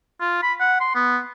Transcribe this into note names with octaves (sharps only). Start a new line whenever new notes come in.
F4
B5
F#5
C6
B3